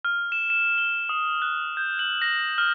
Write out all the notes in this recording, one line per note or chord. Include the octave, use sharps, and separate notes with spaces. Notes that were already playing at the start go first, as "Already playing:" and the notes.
F6
E7
E7
G7
D#6
F#6
G6
F#7
A#6
F6